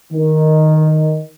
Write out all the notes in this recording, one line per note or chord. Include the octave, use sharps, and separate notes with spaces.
D#3